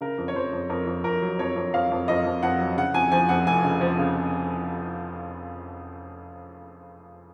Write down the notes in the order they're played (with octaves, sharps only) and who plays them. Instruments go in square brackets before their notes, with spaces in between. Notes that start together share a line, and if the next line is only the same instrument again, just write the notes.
[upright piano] C#3 A#4
F2
C#5
F2 C5
F2
F2 A#4
F2
F2 A#4
F#3
F2 C#5
F2
F2 F5
F2
F2 D#5
F2
F2 F#5
F#3
C#3 F#5
F2 G#5
F3 G#5
F2 F#5
F1 G#5
C#3
F3
C#3